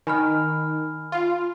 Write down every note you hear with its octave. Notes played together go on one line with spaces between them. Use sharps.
D#3 G#5 B5 F6
F4